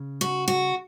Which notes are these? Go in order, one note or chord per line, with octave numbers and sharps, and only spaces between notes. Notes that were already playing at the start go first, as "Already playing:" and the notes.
Already playing: C#3
F#4
F#4